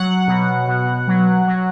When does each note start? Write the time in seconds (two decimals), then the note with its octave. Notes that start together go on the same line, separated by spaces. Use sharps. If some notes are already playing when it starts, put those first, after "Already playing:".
Already playing: F#3 F#5
0.28 B2
0.68 B2
1.07 F#3
1.47 F#3